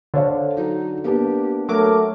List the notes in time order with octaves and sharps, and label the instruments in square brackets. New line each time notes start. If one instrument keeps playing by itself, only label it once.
[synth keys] D3 [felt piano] C5 C#5 F5
[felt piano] F#3 F#4 [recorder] D#4
[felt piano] A#3 B3 D4 [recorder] G4
[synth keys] F#3 D6 [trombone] A3 [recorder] A#4